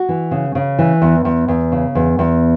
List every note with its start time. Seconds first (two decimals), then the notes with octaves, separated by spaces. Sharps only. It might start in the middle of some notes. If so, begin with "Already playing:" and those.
Already playing: F#4
0.09 E3
0.31 C#3
0.55 C#3
0.79 E3
1.02 E2
1.25 E2
1.48 E2
1.72 C#3
1.95 E2
2.19 E2